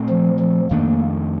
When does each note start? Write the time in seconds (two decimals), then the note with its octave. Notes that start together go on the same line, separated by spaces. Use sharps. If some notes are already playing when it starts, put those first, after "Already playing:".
Already playing: A#2 A3 C4
0.09 F3
0.40 F3
0.70 F2 D#3 A3 A#3 D4